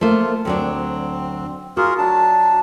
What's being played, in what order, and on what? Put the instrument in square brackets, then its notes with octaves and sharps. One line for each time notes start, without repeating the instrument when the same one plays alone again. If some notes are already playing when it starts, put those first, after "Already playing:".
[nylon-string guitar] A3 A#3 C5 [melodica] F4
[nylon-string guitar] D2 F#3 D4 [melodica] C4
[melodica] F4 G#4 A#4 [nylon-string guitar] F#4
[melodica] F#3 D4 A5